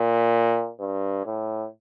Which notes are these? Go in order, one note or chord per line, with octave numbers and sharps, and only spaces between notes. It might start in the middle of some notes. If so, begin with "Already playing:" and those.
Already playing: A#2
G2
A2